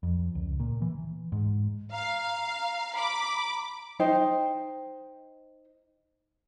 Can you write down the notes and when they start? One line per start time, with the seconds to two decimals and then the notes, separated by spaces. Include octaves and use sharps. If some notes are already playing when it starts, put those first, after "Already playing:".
0.03 F2
0.35 C#2
0.60 A#2
0.82 E3
1.32 G#2
1.92 F5 A#5
2.94 B5 D6
4.00 D#4 C5 G5